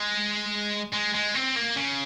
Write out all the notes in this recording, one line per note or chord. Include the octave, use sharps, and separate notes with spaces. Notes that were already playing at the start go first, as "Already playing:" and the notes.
Already playing: G#3
G#3
G#3
C4
A#3
C#3